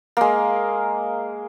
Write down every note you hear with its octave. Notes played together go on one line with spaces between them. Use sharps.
G#3 A#3